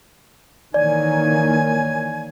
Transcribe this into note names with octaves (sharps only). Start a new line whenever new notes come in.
D#3 E3 A#3 C#5 D5 G#5